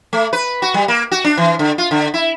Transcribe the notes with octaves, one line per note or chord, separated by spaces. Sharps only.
A3
B4
F#4
G3
A#3
F#4
D4
E3
D3
F4
D3
E4